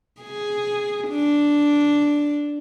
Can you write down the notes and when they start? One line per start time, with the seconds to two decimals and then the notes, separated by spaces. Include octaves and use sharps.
0.21 G#4
1.09 D4